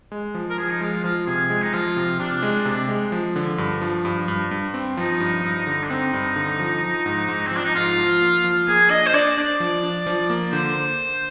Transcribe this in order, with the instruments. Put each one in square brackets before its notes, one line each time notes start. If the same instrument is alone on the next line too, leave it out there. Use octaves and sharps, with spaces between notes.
[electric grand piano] G#3
F3
[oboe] A#4
[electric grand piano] F3 [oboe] G#4
[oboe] D#4
[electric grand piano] G#3 [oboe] F4
[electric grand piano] F3 [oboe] F4
[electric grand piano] C3 [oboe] G#4
[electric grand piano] G#3
[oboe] D#4
[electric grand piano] F3 [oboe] F4
[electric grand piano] C3
[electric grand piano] C3 [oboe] D4
[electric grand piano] G#3
C3
G#3
F3
D3
G2
F3
G2
G2
G2
C4
[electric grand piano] F3 [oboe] D#4
[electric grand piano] G2
G2
D3
[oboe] D4
[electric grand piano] C4 [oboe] D#4
[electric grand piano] G2
D3
F3
F3
G#2
G#2
[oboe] C4
[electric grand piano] F3 [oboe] D4
[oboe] D#4
[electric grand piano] G#2 [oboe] F4
[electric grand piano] F3
A#3
F3
[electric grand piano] A#3 [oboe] G#4
[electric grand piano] D4 [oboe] D#5
[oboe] C5
[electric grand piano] D4 [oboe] D5
[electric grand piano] D4 [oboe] D5
[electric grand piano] F3
D4
F3
A#3
[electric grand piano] D3 [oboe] C5